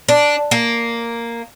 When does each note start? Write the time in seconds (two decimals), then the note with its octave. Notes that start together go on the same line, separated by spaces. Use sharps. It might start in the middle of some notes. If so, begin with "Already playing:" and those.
0.08 D4
0.51 A#3